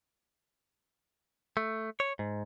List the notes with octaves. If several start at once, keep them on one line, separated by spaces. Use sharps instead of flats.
A3
C#5
G#2